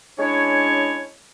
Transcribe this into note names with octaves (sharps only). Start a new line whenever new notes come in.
G#3 C#4 D4 E4 C#5